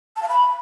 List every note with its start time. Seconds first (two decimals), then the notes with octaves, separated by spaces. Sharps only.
0.16 A5
0.22 F5
0.29 B5